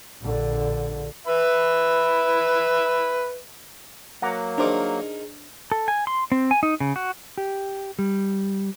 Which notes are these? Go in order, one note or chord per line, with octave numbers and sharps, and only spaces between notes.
A#1 D3
B4 E5 B5
F#3 A#3 F#5 A#5 D6
D4 D#4 G#4 A#4 C5 D6
A4
G#5
C6
C4
G#5
D#4
C#3
F#4
G4
G3